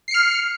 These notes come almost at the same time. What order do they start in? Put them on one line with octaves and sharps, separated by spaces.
C7 C#7 F6